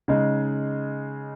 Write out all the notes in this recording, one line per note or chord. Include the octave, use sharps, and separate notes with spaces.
C#3 G#3 D#4